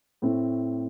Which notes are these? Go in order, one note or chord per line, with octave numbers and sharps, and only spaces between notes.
A2 A3 C4